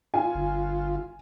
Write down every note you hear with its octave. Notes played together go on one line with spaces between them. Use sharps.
F4 G#5
G1